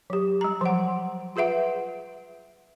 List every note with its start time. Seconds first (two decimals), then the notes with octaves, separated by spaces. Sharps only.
0.10 F#3 G4
0.41 G3 A#5
0.61 F3 F#3 F#5
1.36 F4 G#4 B4 E5 F#5